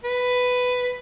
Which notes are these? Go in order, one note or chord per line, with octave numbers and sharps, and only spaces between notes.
B4